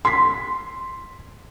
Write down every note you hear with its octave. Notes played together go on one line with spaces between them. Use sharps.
C6 B6